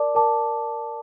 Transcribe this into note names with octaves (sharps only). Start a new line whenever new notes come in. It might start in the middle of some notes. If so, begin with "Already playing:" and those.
Already playing: A#4 D5 A5 D6
A#4 D5 A5 D6